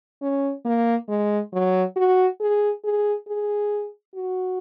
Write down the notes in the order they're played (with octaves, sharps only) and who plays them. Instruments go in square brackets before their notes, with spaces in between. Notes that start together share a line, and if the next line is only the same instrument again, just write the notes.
[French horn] C#4
A#3
G#3
F#3
F#4
G#4
G#4
G#4
F#4